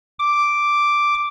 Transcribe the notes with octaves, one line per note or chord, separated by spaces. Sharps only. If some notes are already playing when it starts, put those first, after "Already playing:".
D6